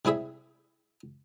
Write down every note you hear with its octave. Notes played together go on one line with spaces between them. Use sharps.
C3 G3 E4 G#4 E5